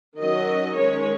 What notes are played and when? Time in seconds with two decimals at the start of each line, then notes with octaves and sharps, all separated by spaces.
0.19 D#3 F#3 C#4 D#5
0.76 D#3 G#3 C#4 C#5